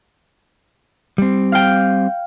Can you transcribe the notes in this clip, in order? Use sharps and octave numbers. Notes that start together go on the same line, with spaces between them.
G3 C4
F5 G5